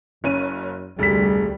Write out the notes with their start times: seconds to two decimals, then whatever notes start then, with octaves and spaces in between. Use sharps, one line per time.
0.24 F#1 F#2 C#4 D#7
0.99 F1 D2 G3 G#4 B6